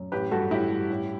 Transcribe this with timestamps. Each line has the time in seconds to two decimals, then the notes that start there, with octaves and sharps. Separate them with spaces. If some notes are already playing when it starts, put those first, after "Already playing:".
Already playing: F#2
0.12 A1 G4 B4
0.31 G2 F#4 A4
0.51 A1 E4 G4
0.71 G2
0.90 A1